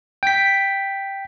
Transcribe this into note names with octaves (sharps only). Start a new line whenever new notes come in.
G5 B6